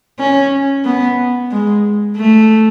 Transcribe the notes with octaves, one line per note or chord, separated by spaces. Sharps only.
C#4
B3
G#3
A3